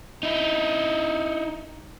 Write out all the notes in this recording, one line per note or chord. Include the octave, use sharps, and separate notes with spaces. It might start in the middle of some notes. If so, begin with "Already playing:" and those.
D#4 E4